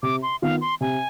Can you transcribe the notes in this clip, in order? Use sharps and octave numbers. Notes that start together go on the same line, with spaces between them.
C3 D6
C6
D#3 B3 F4 F5
C6
C3 G#5